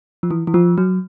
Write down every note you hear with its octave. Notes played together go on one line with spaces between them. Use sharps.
F3
E3
E3
F3
F#3